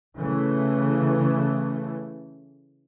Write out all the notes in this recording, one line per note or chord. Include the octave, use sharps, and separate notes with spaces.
C#3 E3 A3